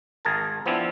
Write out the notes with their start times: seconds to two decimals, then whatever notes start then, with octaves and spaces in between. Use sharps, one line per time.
0.25 G#1 G#4 A#4 A5
0.66 F3 B3 C4 D4 E4 F4